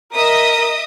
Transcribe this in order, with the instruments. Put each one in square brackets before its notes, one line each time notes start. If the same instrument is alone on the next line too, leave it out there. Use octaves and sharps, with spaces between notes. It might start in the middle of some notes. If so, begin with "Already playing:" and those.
[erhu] A#4 [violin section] D#5 E5 D#6